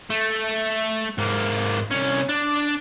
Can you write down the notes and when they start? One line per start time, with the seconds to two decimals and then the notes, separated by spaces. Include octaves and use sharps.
0.10 A3
1.18 G#2 A#3
1.91 C2 C#4
2.29 D4